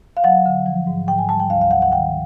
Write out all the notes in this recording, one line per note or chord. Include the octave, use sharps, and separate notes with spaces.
F5
F#3 F#5
D3
F3
G#2
G#2 G5
G#5
G3 A5
G5
D2 F5
F5
D2 F#5
F#5
D#3 G5